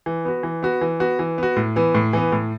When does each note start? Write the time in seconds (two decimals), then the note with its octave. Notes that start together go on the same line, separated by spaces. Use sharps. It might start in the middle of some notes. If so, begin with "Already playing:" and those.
0.06 E3
0.25 B3 F#4
0.43 E3
0.63 B3 F#4
0.81 E3
1.00 B3 F#4
1.19 E3
1.38 B3 F#4
1.56 A2
1.76 E3 B3
1.95 A2
2.13 E3 B3
2.32 A2